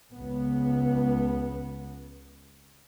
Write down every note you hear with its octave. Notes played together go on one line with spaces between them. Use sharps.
C#2 B3